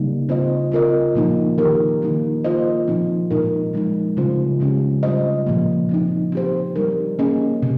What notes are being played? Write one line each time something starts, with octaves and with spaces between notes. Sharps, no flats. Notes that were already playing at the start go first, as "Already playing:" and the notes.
Already playing: C#3 G3 A#3 D#4
C4 F4 C5 D#5
C4 F4 A#4 D#5
A#2 F3 A#3 D#4
D#3 A#3 D#4 G4 A#4
D#3 G3 A#3 D#4
A#3 F4 C5 D#5
A#2 F3 C4 D#4
A#2 G#3 D#4 A#4
F3 G#3 D#4
C#3 G3 C4 F4 C5
C#3 G#3 C#4 G4
G3 C4 F4 C5 D#5
A#2 F3 A#3
F3 C4 D#4
C4 G4 C5
G3 C4 D#4 A#4
A#3 C#4 G#4 D#5
C3